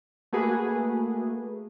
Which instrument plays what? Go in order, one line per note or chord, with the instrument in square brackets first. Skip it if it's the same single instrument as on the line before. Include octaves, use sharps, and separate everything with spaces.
[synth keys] A3 A#3 F#4 G#4 B4